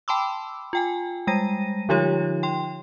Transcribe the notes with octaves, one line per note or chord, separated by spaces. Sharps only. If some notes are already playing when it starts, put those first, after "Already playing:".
G5 A5 B5 C6 D6 E6
F4 G5 G#5
G3 G#3 G5 A#6 D#7
D3 F3 D#4 F4 G4 C#5
G5 C6